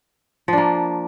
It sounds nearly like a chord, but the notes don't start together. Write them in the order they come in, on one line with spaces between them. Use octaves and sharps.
F3 D4 A#3